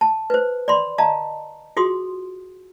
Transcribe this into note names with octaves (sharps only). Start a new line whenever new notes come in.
A5
B4 C5
D5 B5 C6
D#5 F5 A5 A#5
F4 F#4 G#4 C6 D#6